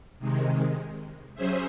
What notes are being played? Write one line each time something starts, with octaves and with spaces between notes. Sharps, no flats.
C3 D#3 G#3
F#3 C#4 G#4 C5 E5